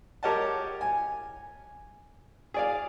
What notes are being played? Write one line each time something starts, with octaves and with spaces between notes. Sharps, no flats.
G4 A#4 C#5 D#5 F#5 A5
G#5
G#4 D5 F5